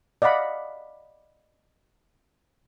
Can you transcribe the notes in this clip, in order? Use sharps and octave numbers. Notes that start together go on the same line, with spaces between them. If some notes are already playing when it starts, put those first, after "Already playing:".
D5 D#5 F5 F#5 B5